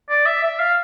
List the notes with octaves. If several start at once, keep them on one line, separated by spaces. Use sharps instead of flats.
D5
E5
E5
F5